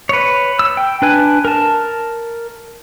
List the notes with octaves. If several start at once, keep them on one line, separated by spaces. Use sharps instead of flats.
B4 C#5
E6
G5
D4 B4 G#5
A#4 A5